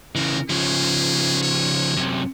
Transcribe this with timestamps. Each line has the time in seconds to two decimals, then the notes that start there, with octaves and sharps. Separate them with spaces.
0.15 C#3 E3 A#4
0.50 C#3 F3 G#4
1.43 C#5
1.97 F#2 C3